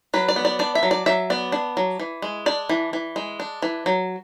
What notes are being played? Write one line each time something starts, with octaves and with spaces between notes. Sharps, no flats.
F#3 B4
D5
B3
D5
D4 D5
E5
F#3
D5
F#3 E5
B3 D5
D4
F#3
E3
G#3
D4 D5
E3
E3
G#3
D4
E3
F#3